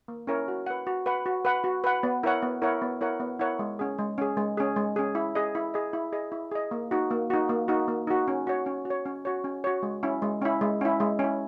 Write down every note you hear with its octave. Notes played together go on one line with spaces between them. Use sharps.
A#3
C#4 E4 A#4 C#5
F#4
B4 F#5
F#4
B4 F#5
F#4
B4 F#5
F#4
B4 F#5
B3
E4 A#4 C#5 F#5
B3
E4 A#4 C#5 F#5
B3
E4 A#4 C#5 F#5
B3
E4 A#4 C#5 F#5
G#3
C#4 G#4
G#3
C#4 G#4
G#3
C#4 G#4
G#3
C#4 G#4
E4
G#4 D#5
E4
G#4 D#5
E4
G#4 D#5
E4
G#4 D#5
A#3
D#4 F#4
A#3
D#4 F#4
A#3
D#4 F#4
A#3
D#4 F#4
C#4
F#4 C#5
C#4
F#4
C#5
C#4
F#4 C#5
C#4
F#4 C#5
G#3
C#4 E4
G#3
C#4 E4
G#3
C#4 E4
G#3
C#4
E4